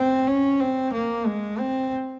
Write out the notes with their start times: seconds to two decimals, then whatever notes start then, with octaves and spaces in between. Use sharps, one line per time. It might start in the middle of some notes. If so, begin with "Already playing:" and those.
Already playing: C4
0.27 C#4
0.60 C4
0.93 A#3
1.26 G#3
1.58 C4